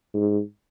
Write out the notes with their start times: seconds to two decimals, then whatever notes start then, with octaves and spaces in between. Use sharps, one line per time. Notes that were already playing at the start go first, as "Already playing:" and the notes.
0.14 G#2